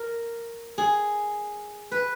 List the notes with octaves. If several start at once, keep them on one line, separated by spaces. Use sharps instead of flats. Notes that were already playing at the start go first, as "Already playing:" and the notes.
Already playing: A#4
G#4
B4